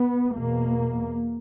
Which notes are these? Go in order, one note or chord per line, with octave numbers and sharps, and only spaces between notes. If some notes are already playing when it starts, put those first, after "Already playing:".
Already playing: B3
E2 B2 A#3